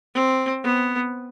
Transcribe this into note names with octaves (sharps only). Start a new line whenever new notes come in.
C4
B3